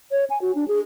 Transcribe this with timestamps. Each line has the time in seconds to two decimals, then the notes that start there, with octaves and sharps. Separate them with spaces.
0.12 C#5
0.30 G#5
0.42 F#4
0.55 D4
0.68 G#4